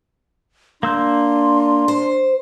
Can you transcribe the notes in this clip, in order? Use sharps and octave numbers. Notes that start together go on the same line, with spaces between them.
A#3 D4 C6 E6 G6
C5